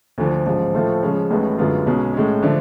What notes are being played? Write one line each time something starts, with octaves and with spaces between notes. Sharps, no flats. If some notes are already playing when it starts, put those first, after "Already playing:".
D2 D3 F3
A1 G#2 F3
A2 F3 A3 F4 A4
C#3 F3 G#3 C#4
A1 A2 G#3 B3
F#2 D3 G#3 B3 F4
B1 B2 G#3 C#4 G#4
A2 G#3 C#4
D3 F3 A3 D4